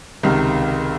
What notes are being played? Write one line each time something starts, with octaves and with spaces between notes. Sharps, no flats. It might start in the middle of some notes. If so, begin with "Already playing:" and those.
C#2 C3 D#3